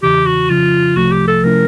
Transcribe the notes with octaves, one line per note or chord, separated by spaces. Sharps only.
E2 C#3 E3 G4
F#4
F2 C#3 F3 F4
C2 C3 F3 A3 F#4
G4
A4
C3 F3 A3 C#4 E4 A#4